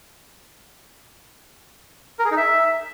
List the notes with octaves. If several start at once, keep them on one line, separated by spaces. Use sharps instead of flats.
A#4
G#4
D#4
E5